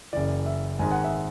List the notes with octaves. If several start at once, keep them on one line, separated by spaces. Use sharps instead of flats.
F#1 F#2 E3 D5
E5
G#1 G#2 G#3 G#5
F#5
E5